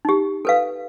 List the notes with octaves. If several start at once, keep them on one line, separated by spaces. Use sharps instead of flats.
D#4 G4
A4 B4 F5